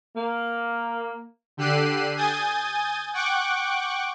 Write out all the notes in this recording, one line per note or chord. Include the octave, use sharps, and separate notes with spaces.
A#3
D3 G4 E6 F#6 C7 D#7
G#5 D#6 G6 A6
F#5 G5 C#6 D6 F#6